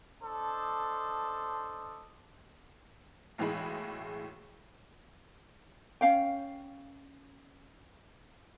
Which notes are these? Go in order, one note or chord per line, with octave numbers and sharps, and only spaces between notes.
D4 A4 C5 D#5
B1 A2 E3 G#3 G#4 B5
C#4 F5 G5